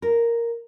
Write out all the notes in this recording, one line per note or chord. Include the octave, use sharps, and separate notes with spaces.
A#4